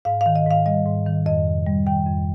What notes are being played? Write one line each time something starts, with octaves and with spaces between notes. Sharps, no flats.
G#2 F5
F5
D#3
D#5
G#2 F5
G3 D#5
G#2
D#3
F2 D#5
C3
G3
D#3 G5
F2